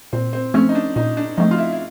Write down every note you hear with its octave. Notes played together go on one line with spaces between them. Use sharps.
A#2 C4
C4
F3 A3 C4 C#4
D#4
D4
A#2 D#4
D4
F3 A3 C4 D#4
F4
E4
E4